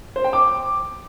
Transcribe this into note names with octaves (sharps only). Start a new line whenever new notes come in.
C5
G5
D6